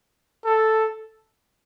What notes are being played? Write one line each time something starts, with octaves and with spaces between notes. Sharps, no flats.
A4